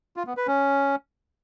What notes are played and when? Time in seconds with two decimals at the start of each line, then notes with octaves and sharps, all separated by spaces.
0.17 F4
0.27 B3
0.37 B4
0.47 C#4